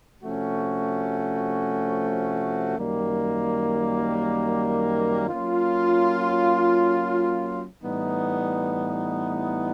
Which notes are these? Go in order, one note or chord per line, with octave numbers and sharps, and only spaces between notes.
C3 F3 A3 C#4 F#4
F#2 D#3 G3 A#3
F#3 A#3 C#4 F4
A2 E3 G3 B3 D#4